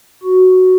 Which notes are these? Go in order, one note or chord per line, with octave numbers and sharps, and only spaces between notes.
F#4